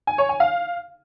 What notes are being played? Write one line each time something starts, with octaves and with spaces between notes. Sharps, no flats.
G#5
C#5
G#5
F5